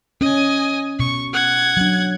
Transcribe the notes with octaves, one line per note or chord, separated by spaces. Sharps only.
C#4 D#5 G#5
B2 C#6
F#5 G#6
F#3 D4